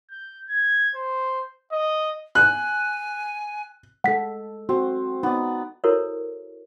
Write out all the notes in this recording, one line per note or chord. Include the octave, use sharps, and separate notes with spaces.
G6
G#6
C5
D#5
G#5 F#6
G#3 A4 F#5 B6
C4 F#4
B3 D#4 D5
E4 F#4 A4 A#4 C5 C#5